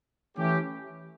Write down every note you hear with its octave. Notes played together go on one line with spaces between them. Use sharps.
E3 A3 C#4 E4 G4